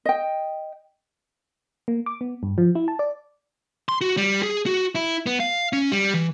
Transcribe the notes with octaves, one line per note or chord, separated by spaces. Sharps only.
D#5 G5
A#3
D6
B3
G2
F3
E4
A5
D5
C6
F#4
G3
G#4
F#4
E4
B3
F5
C#4
G3
E3